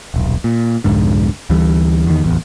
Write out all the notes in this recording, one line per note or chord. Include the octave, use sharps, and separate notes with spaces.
D#1 B1
A#2
C2 F2 G#2 D3
D2 E3 G3
E2 D#3
D1 A1 E2